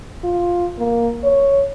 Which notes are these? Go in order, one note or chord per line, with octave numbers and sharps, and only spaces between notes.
F4
A#3
C#5